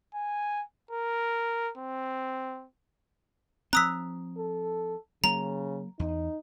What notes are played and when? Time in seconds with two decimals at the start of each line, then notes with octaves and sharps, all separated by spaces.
0.15 G#5
0.91 A#4
1.78 C4
3.73 F3 C4 A#5 D#6 E6 F#6 B6
4.37 A4
5.24 C#3 F#3 A#3 A#5
5.99 E2 D#4